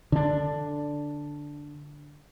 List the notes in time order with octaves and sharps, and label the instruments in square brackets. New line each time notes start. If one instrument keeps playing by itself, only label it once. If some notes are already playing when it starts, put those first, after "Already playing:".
[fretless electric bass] D3 D4